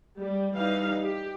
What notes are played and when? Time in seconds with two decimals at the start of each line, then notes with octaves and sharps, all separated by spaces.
0.17 G3
0.53 E3 G3 D#4 F5
1.03 G4